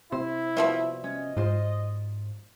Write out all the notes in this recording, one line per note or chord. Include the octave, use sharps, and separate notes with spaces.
C3 E4 C5
B2 F3 G3 E5
C#4 D#5
G#2 F4 C5